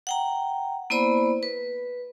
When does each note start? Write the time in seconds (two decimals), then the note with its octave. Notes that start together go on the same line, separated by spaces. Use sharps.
0.07 F#5 G5 A#5
0.90 A#3 B3 E4 C5 D5 B5
1.43 B4